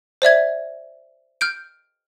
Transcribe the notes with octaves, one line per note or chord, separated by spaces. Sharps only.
C5 D5 E5 G#6
F6 G6 D7